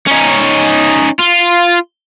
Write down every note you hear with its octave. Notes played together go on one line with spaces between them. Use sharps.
C#4 D#4
F4